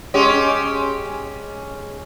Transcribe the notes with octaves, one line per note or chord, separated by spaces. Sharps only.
G#3 C#4 G4